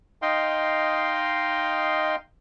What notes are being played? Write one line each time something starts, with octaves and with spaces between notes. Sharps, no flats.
D#4 D#5 F5 G5 C6